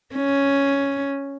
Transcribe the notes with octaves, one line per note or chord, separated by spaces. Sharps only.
C#4